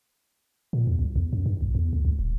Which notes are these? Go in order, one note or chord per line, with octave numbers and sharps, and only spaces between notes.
A#2
E2
C2
E2
F#2
G2
B1
E2
D2
C#2
D#1